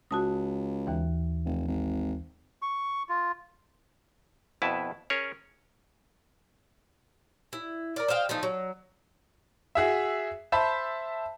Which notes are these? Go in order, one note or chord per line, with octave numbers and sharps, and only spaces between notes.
C#2 F#4 A5 D#6
D#2 E3
F1
G#1
C#6
F4
F2 B2 E4 B4 A5
C#4 G#4 A#4 C#5
E4
A#4 D5
C5 D#5 F5 G5
F3 A3 D#4
F#3
F#4 G#4 E5
C5 E5 A5 B5